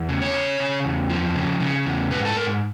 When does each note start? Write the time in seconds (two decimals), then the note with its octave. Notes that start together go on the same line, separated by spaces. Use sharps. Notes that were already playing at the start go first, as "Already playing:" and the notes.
Already playing: E2
0.09 C#3
0.22 C#5
0.34 C#3
0.60 C#3
0.85 E2
1.10 F3
1.35 C#3
1.60 C#3
1.86 E2
2.11 G#2 B4
2.25 A4
2.36 G#2 A#4